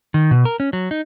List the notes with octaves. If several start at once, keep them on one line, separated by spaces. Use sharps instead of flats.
D#3
B2
A#4
C#4
F#3
D#4